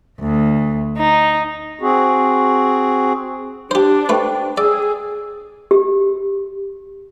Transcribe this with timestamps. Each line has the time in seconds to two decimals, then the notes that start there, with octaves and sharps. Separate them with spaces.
0.21 D2
0.97 D#4
1.81 C4 F#4 G#4
3.71 D4 G4 C5
4.09 A3 B4 C5 G5
4.58 G#4 D5 E6
5.71 G4